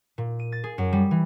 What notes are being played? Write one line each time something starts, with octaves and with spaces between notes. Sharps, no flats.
A#2
D#7
A6
G#4
F#2
G3
E3